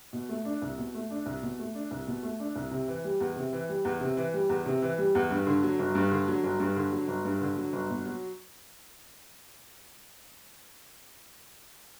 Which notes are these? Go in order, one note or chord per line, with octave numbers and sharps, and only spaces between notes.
B2
A3
D4
C2
B2
A3
D4
C2
B2
A3
D4
C2
B2
A3
D4
C2
C3
E3
G3
E2
C3
E3
G3
E2
C3
E3
G3
E2
C3
E3
G3
E2
G2
D3
F#3
G1
G2
D3
F#3
G1
G2
D3
F#3
G1
G2
D3
F#3
G1
B2
F#3